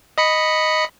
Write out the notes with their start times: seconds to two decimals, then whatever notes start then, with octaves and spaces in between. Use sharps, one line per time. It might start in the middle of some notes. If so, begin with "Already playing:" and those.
0.18 D#5 B5 C#7